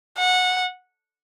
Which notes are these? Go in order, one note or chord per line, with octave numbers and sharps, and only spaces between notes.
F#5